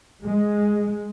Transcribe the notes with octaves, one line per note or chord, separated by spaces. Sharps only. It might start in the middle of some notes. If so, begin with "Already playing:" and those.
G#3